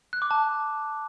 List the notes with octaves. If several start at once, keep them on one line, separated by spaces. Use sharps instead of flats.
F#6
D6
A5